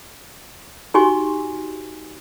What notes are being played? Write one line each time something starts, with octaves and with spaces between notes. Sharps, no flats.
D#4 F#4 G4 G#5 C6 C#6